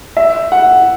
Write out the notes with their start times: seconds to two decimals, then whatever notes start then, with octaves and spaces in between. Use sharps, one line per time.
0.17 E5
0.52 F#5